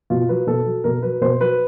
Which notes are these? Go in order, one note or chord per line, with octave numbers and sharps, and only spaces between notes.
B2 F4
F#3 B4
B2 A4
F#3
B2 A#4
F#3 B4
B2 C5
F#3 B4